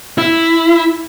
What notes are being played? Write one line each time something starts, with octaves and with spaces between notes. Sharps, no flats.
E4